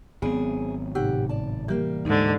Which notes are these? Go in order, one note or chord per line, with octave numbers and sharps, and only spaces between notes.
G#1 F#3 B3 C4 G#4
A2 C3 D#4 G4 F#5
D5 A5
E3 G3 A#3 G4 F5
D2 G#2 D3 D#4